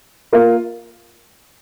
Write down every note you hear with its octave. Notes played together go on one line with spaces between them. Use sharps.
A#3 F4 A#4